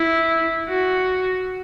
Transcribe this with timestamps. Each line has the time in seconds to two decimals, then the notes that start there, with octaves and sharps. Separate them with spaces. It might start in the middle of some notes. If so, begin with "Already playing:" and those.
Already playing: E4
0.68 F#4